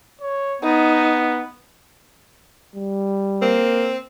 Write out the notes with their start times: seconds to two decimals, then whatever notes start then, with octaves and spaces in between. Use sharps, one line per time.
0.21 C#5
0.62 B3 D#4
2.75 G3
3.42 A#3 C4